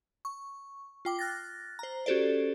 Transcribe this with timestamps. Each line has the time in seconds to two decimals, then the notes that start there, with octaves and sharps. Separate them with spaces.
0.25 C#6
1.05 F4 G5 D6
1.19 F6 F#6 A6 A#6
1.79 C5 A#5
2.06 C#4 F#4 G4 A4 C5 D5